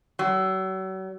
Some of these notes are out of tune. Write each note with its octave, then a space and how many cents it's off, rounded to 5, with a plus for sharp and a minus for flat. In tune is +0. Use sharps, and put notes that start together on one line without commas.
F#3 +40